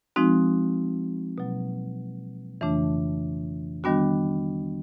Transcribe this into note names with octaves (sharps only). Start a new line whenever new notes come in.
F3 G#3 C4 D#4 F#4
B2 F#3 A#3
F2 C#3 E3 A3 D4
D#3 G3 B3 D4 F#4